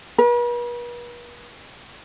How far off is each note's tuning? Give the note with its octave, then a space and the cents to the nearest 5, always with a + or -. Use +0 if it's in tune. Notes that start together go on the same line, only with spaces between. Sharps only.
B4 -45